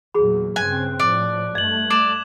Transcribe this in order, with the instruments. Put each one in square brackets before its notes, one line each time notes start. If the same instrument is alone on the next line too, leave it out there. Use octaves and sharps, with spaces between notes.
[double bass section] E2 A#2 F#3 [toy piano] G#4 B5
[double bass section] G2 C#3 C4 [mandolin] G#5 [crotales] F#6
[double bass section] A2 F3 [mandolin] D5
[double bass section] G2 A3 [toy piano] D#5 [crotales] G#6 F#7
[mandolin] D5 [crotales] D6 E7 F7